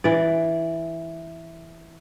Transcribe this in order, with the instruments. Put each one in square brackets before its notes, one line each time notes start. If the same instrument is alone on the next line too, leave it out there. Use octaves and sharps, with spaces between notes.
[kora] E3 D5